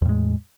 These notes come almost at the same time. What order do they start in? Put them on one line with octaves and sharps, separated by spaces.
E2 A2 G#3